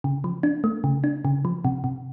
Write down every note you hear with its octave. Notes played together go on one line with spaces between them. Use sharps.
C#3
F3
D4
A3
C#3
D4
C#3
F3
C3
C3